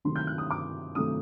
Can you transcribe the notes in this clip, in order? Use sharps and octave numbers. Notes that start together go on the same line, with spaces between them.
C3 D#3 F#3 A3 C4 C6
G6
F#6
D#6
D6
C3 D#3 F#3 A3 C4 D#6